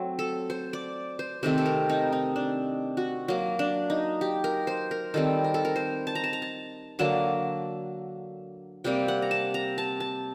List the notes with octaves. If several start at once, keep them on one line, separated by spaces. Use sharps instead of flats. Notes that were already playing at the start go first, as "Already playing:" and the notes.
Already playing: F#3 A3 C4
A4
C5
D5
C5
C3 D#3 A3 C4 C5
A4
A#4
D#4
D#4
D4
F#4
F#3 A#3
D4
D#4
G4
A#4
C5
A#4
D#3 G3 C4 A4
A#4
A4
A#4
C5
A5
A#5
A5
A#5
A5
D3 F#3 A#3 A5
C3 G3 A#3 G5
F#5
A#5
A5
A#5
A5
A5